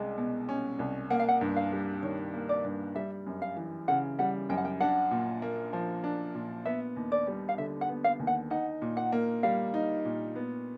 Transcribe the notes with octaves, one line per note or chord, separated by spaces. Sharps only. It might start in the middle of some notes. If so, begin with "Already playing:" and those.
Already playing: C2 G#3 C#4
B2
C#4
C2
A#3 F#5
F5
F#5
G2
F5
G3
D#3 C#5
A#3
D5
G2
G3 E5
F#2
F5
E3
C#3 F#5
G3 F#5
F#2 G5
F#5
G5
D4 F#5
A#2
A#3
F3
D4
A#2
B3 E5
D#2
D5
G3
F5
D3 E5
F#5
B3
F5
D#2
F#5
D#4 F#5
A#2
F#5
A#3
G3 F5
D#4
A#2
B3